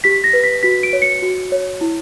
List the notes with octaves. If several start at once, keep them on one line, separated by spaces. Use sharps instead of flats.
G4 B6
A#6
B4
B6
F#4 B6
D7
C#5
C#7
F#4
C#5
E4